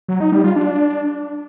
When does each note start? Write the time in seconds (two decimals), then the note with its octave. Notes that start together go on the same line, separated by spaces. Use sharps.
0.08 F#3
0.20 D#4
0.32 G3
0.44 F4
0.56 D4